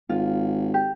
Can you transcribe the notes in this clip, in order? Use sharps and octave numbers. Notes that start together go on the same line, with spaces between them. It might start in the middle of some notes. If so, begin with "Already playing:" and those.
G#1 F4
G4